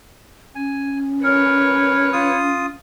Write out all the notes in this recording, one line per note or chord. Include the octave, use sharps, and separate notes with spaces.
C#4 G#5
A#4 B4 C#5
F4 D#6